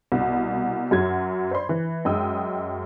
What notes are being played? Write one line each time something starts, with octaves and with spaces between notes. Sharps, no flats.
C2 B2
F#2 F#3 G#6
C5 D5 B5 C6
E3
F#2 G#3 G5 D#6 E6